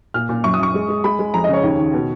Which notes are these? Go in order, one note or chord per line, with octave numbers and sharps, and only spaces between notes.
A#2 F6
A#2
F#2 C#6
D#6
F#2 C#6
G#3
G#3
G#3 B5
G#3
F2 A#5
D#5
C#3 C#5
D#2
D#3
B2